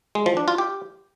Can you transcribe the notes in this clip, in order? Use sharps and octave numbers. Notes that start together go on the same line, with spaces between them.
G#3
F3
D4
F4
G4